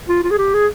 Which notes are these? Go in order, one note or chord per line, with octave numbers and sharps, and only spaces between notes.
F4
F4
G#4
G4
G#4